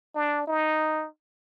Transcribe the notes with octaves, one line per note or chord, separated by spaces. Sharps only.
D4
D#4